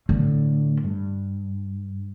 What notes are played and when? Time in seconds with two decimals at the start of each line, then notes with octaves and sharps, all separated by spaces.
0.09 A2 D3
0.84 G2